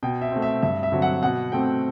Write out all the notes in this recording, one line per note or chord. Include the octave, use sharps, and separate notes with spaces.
B2 G5
E5
A3 C4
E5
G2 E5
E5
D3 F#3 C4
F#5
B2 F#5
A3 C4 G5